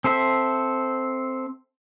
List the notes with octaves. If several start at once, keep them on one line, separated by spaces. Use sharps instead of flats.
C4 A4 C5 E5